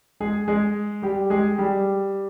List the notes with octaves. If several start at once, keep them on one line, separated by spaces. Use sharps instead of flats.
G#3 G#4
G#3 G#4
G3 G4
G#3 G#4
G3 G4